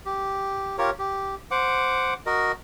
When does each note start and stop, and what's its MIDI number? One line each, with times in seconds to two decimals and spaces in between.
0.05 0.76 67
0.78 0.91 65
0.78 0.91 67
0.78 0.91 70
0.78 0.91 73
0.98 1.35 67
1.51 2.14 72
1.51 2.14 78
1.51 2.14 86
2.26 2.52 66
2.26 2.52 70
2.26 2.52 75